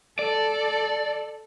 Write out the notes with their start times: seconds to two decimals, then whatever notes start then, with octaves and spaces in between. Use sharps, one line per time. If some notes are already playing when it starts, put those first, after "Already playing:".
0.19 A4 D5